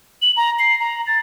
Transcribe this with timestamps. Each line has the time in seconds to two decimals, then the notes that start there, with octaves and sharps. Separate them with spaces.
0.22 F#7
0.37 A#5
0.59 C7
0.80 A#5
1.07 A6